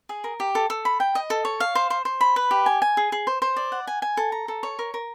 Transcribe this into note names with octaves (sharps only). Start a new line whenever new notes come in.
G#4
A#4
G4
A4
A4
B5
G5
D#5
A4
C#5
F5
C5
C5
C5
B5
B4
G4
G#5
G#5
G#4
G#4
C5
C5
D5
F#5
G#5
G#5
A4
A#5
A4
C#5
A#4
A#4